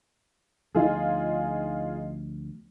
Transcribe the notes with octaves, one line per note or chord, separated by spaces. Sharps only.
D2 F3 B3 D#4 F4 G#4